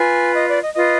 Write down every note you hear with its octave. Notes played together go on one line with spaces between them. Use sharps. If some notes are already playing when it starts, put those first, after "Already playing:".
Already playing: F4 B4 G#5
D#5
D5
D#5
F4 B4 D#5